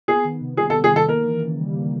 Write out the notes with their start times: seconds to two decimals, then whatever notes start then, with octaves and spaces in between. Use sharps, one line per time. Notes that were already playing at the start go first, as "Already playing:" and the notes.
0.08 B3 G#4
0.25 D#3
0.41 C3
0.57 G3 G#4
0.70 A4
0.75 B3
0.84 G#4
0.92 D#3 A4
1.09 A#3 A#4
1.25 E3
1.42 C#3
1.59 G3
1.76 A#3